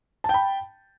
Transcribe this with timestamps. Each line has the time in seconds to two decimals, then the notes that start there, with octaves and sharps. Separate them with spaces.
0.24 A5
0.29 G5
0.34 B5